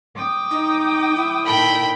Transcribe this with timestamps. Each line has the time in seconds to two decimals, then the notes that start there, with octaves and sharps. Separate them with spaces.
0.16 G5 D6 D#6
0.51 D#4
1.16 E4
1.46 A#2 D#3 A4 G5 B5